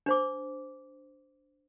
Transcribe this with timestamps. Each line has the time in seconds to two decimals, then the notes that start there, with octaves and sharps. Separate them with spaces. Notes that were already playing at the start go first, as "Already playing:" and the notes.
0.06 D4 C5 D6